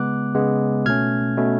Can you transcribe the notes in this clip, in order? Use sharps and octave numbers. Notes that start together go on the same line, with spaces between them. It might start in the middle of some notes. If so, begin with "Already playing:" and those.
Already playing: C#3 G#3 B3 D6 F#6
C#3 G#3 B3
B2 A3 C#4 F6 G#6
B2 A3 C#4